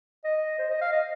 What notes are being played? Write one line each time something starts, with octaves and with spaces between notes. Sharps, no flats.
D#5
C5
D#5
F5
D#5